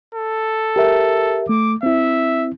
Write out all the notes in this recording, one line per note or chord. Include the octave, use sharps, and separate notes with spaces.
A4
G4 A#4 E5
A3 D6
C4 E4 E5